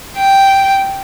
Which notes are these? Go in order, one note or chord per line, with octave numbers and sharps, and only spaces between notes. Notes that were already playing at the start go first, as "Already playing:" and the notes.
G5